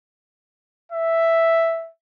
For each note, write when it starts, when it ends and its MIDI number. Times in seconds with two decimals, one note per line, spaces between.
0.92 1.89 76